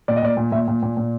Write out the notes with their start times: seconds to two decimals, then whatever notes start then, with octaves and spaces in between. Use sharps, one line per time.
0.08 A#2 D5
0.16 D#5
0.22 A#2 D5
0.37 A#2
0.52 A#2 E5
0.68 A#2
0.83 A#2
0.97 A#2